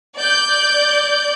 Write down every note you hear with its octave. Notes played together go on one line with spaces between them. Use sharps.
D5 G6